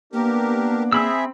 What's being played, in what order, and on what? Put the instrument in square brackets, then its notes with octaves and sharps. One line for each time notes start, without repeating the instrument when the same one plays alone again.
[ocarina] A#3 [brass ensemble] B3 D4 [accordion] G4 A#4
[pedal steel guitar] C4 B5 E6 [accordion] G#4 E5